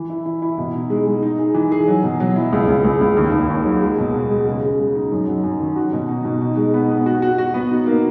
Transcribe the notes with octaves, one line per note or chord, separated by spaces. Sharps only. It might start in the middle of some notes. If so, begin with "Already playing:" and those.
Already playing: E3
E4
E4
E4
B2
D#4
G#3
G#3
D#4
G#4
E3
G#4
F#3
B2
F#3
E4
C#2
C#2
C#2
C#2
D#2
D#2
D#2
F#3
G#3
B2
B3
G#3
C#3
C#3
G#3
D#4
F#2
F#3
F#2
D#3
F#4
B2
D#4
B2
D#4
G#3
B3
B3
F#4
F#4
F#4
B3
D#4
A#3